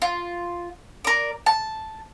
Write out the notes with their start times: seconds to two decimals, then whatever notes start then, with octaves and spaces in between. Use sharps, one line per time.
0.02 F4
1.04 A#4 D5
1.46 A5